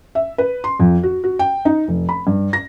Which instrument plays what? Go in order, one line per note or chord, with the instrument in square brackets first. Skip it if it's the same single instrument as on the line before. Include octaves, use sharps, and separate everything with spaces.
[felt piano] E5
B4
C6
F2
F#4
F#4
G5
D#4
F1
B5
G2
A#6